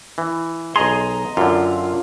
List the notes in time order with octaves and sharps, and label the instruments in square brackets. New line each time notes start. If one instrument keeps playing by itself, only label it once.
[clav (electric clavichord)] E3
[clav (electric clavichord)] B1 G#4 [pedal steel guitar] D#5 A#5 C6
[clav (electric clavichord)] F#2 D3 [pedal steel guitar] F4